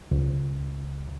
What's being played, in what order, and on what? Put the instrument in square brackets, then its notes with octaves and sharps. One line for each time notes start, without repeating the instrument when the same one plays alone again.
[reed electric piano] C#2